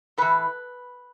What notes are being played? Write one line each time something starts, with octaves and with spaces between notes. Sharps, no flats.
A2 E3 B4